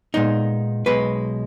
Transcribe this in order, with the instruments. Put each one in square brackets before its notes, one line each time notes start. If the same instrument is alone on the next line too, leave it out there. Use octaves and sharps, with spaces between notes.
[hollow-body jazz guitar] A#2 G#3 B3 D#4
B1 B2 G#3 B4